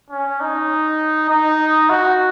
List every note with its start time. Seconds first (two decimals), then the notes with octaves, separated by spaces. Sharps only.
0.10 C#4
0.40 D#4
1.29 D#4
1.89 F#4